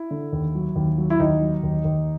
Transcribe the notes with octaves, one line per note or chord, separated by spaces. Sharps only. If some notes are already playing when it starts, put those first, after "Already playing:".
Already playing: E4
D3
D#2
F#3
D#2
F#3
E4
D#2 D#4
F#3
D#2
D#2